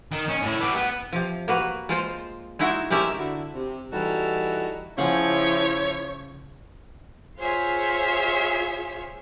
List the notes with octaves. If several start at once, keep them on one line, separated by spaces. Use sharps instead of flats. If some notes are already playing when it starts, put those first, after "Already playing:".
D#3
C#4
A2
B3 G4
B3
C3 F3
A#3 F#4 B4
G#3 F4 C5
G#3 D#4 E4 F#4 E5
C3 G#3 C#4 G4 A#4 E5
D3 E4 F#4
C3
E3 G3 D#4 E4 F#4 A4
C#3 F3 E4 G#4 C#5 F#5
F4 G#4 C5 C#5 E5